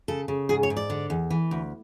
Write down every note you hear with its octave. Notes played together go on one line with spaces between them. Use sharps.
C#3 A4
C#3
G#2 G#4
C#5
G#2
D5
D3
E2
E3
D2